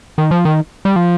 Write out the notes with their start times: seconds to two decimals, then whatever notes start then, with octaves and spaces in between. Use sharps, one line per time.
0.18 D#3
0.31 F3
0.45 D#3
0.85 G3
0.96 F3